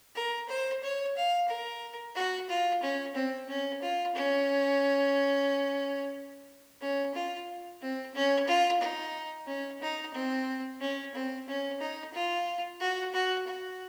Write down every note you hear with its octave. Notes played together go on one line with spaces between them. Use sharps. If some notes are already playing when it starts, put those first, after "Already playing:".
A#4
C5
C#5
F5
A#4
F#4
F4
C#4
C4
C#4
F4
C#4
C#4
F4
C4
C#4
F4
D#4
C#4
D#4
C4
C#4
C4
C#4
D#4
F4
F#4
F#4
F#4